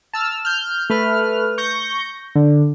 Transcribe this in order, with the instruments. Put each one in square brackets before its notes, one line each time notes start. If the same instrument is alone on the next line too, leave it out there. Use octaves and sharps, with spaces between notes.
[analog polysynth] A5 E6 F6
F6 G6
A3 B4 F6
C#6 G6 A#6
D3